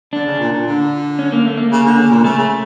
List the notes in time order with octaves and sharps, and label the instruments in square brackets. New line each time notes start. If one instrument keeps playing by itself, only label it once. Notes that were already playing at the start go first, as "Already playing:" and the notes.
[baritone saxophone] D3 [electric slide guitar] D4
[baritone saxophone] C#3
A#2
A#2
D3
[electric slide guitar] C#4
A#3
A3
A#3
[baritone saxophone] C#3
D3
C#3
A#2
[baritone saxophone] C#3 [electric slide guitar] A3
[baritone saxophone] C#3